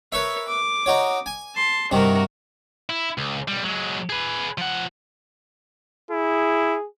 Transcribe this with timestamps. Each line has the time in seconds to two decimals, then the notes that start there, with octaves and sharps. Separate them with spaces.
0.12 A#4 B4 C#5 E5
0.48 D6
0.86 D#4 F#4 C#5
1.26 G#5
1.55 A5 C6
1.91 G2 C3 D#3 F#4 A#4
2.90 E4
3.18 C#2
3.48 B1 G3
3.63 F#3 G#3
4.10 G#4 B4
4.58 F3 F#5
6.11 E4 G#4